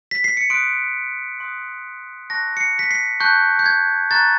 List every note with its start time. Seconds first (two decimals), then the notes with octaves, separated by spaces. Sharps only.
0.11 B6
0.24 C7
0.37 C#7
0.50 C6 D#6 F#6 D7
1.40 C6 D#6 F#6
2.30 A5 C#6 F#6 A#6
2.57 C#7
2.60 C7
2.79 B6
2.91 C7
3.20 A5 C#6 F#6 G6
3.59 G6
3.66 G#6
4.11 A#5 C#6 F#6 A6